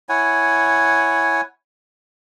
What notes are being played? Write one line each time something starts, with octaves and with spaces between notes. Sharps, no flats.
E4 C#5 F#5 G#5